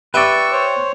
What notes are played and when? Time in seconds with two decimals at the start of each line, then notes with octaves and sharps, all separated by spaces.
0.14 G4 B4 D5 E5 G5 C#6 E6
0.52 C5 C#5